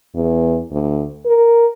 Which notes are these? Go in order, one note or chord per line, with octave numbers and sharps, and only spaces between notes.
E2
D2
A#4